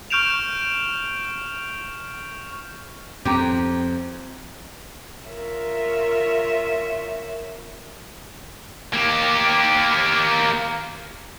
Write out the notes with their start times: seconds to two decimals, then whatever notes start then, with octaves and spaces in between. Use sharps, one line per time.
0.10 C#6 F6 G6 D7 E7 F7
3.25 F2 C4 G4 A#5
5.29 F4 A#4 C#5 E5
8.93 A#3 G4